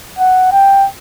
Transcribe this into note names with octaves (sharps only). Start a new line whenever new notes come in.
F#5
G5